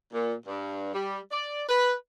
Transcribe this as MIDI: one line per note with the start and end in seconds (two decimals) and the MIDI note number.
0.13 0.34 46
0.47 0.94 43
0.94 1.18 55
1.32 1.62 74
1.69 1.92 71